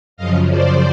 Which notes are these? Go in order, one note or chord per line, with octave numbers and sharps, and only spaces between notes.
F#2 C#3 F3 D#5 F5
C5 D5